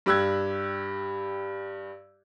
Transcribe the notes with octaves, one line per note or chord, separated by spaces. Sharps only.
G2 G4 E6 F#6 G#6